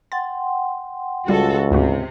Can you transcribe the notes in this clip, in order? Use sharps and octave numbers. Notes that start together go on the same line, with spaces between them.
F#5 G5 C6 A6
C#2 G3 F4 F#4 A4
D2 G#2 C3 F#4